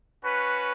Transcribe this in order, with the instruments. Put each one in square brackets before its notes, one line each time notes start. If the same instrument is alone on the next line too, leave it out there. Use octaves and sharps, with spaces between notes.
[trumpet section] C#4 F#4 B4